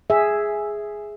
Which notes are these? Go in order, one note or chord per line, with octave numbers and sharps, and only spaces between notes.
G#4 E5